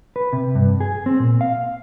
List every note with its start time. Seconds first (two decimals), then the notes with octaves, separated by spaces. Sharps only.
0.16 B4
0.33 C3
0.55 G2
0.81 G#4
1.06 C4
1.20 A#2
1.41 F5